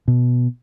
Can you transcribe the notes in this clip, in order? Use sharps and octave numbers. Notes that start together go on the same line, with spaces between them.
B2